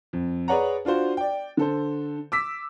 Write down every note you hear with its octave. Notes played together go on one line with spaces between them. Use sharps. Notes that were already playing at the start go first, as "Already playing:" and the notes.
F2
G#4 B4 C#5 D5 F#5 A#5
D4 F4 F#4 C5
D5 G5
D3 A4 C5
D6 E6 B6